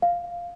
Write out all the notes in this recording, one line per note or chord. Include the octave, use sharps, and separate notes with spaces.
F5